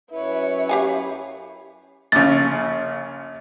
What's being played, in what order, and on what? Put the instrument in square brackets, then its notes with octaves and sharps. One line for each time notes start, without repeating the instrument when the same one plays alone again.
[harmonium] F#2 B4 [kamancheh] E4 C#5
[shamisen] G4 F5 G#5
[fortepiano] A#1 C#3 [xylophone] A6